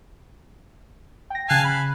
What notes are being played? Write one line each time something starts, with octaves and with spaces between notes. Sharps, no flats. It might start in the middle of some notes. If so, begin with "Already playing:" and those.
G5 A#6
C#3 F5 G#5 A5 F#6 C7
B5